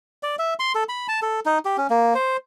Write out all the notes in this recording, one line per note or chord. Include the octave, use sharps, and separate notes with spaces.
D5
E5
C6
A4
B5
A5
A4
D#4
G4
C#4
A#3
C5